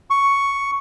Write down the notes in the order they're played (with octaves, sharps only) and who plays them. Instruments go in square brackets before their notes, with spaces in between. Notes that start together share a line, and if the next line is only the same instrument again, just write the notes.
[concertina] C#6